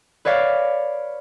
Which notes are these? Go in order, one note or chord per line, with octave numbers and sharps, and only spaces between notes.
B4 C#5 D5 F5